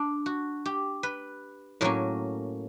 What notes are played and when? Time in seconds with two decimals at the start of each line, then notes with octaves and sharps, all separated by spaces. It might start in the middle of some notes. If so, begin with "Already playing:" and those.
Already playing: D4
0.26 F#4
0.65 G4
1.03 B4
1.81 A2 F#3 A#3 C#4 A#4